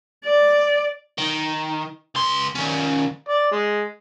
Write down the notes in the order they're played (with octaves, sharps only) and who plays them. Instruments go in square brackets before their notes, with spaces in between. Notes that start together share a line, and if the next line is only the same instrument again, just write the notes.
[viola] D5
[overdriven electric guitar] D#3
C#2 C6
D#3 C#4
[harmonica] D5
G#3